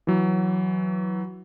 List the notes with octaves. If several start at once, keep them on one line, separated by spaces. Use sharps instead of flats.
E3 F#3